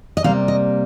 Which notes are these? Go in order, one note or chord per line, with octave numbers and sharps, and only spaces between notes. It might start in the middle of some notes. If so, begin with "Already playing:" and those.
D#5
C3 G3 A#3 F5
D#5